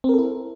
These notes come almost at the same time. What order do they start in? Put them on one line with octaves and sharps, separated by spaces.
C4 A#4 A4 E4